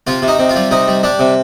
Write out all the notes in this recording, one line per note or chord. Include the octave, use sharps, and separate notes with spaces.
C3 F4
C3
D#4
C3
F4
G3
C3 D#4
G3
G3 D4
C3